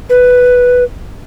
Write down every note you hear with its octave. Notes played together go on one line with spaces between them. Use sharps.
B4